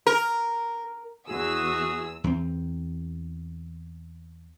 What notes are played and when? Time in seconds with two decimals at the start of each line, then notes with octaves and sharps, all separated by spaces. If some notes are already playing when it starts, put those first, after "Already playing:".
0.07 A#4
1.28 E2 F#4 G#4 E6
2.24 E2 C4